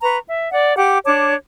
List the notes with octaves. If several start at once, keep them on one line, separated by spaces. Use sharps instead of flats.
B4 A#5 C#6
E5
D5 F#5
G4 F#5 D6
D4 C#5 A5 D6